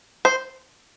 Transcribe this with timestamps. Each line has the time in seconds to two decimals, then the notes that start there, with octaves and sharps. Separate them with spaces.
0.25 C5